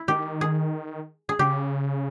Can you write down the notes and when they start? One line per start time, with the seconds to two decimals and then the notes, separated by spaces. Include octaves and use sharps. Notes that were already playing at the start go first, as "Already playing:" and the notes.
Already playing: E4
0.08 D#3 G4
0.41 G#4
1.29 G#4
1.39 C#3 G4